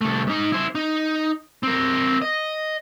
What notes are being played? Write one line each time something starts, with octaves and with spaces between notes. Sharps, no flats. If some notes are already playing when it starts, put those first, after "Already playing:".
C2 A3
G#2 D#4
E4 C5
D#4
C4 A#4
D#5